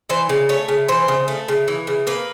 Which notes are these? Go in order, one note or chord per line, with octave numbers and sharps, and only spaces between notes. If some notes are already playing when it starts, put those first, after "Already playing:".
E3 C5
C#3
A3 C#5
C#3
E3 C5
C#3
A3
C#3
E3
C#3
A#3 B4